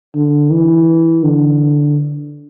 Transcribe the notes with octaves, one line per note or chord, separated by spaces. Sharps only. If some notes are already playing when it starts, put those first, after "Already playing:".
D3
E3
D3